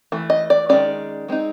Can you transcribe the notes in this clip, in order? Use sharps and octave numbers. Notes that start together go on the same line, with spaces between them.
E3 A3
D#5
D5
D#3 G#3 C#4 D5
G#3 C4 D#4